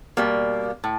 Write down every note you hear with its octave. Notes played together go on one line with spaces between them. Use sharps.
B2 G3 A#3
A2